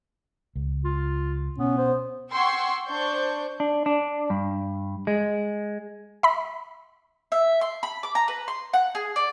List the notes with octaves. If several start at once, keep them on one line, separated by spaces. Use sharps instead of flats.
C#2
F4
B2 B3 C#4
C5
F#5 G5 C6 C#6 E6 G#6
D4 C5 C#6 G6
D4
D4
G2
G#3
E5 B5
E5
C6
B5
D6
A#5
B4
C6
F#5
G#4
D5